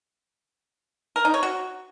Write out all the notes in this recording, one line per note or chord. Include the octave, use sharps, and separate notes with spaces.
A#4
D#4
C#5
F#4